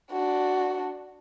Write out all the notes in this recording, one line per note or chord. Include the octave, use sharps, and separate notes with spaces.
D4 F#4